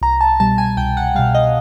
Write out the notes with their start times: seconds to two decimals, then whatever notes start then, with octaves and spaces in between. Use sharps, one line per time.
0.01 C2 A#5
0.21 A5
0.40 B2 G3 A5
0.58 G#5
0.77 C2 G5
0.97 F#5
1.15 G3 F5
1.19 B2
1.35 D#5